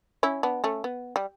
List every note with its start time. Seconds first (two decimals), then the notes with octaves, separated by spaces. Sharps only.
0.23 C#4 E4
0.43 B3 D4
0.64 A3 C#4
0.84 B3
1.16 G3